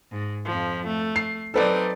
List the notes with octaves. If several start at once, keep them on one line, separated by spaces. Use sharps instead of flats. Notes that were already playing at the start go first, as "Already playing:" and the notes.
G#2
F2 F3
A3
C7
F#3 C4 D#4 A4 B4 D5